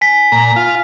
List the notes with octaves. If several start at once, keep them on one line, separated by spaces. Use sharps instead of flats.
G#5 B6
A#2 A#5
F4